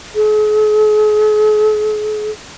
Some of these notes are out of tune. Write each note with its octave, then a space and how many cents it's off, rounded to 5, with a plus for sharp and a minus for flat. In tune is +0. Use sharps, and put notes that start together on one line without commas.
G#4 +45